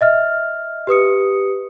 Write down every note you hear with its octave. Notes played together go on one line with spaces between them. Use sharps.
D#5 E5 F6
G4 B4 D#6 C#7